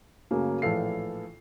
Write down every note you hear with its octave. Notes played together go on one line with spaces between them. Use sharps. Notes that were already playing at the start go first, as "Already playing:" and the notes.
F#2 C#3 F#3 A3 A#3
A#1 A2 E3 A4 F5 C7